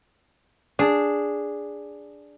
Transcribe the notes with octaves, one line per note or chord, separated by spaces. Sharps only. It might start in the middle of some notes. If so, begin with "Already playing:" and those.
D4 G#4